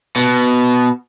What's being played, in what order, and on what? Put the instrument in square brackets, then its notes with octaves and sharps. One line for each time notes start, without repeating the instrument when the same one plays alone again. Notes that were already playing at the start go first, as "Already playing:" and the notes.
[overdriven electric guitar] B2